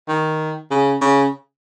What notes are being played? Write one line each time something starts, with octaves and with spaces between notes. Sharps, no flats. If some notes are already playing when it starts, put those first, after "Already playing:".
D#3
C#3
C#3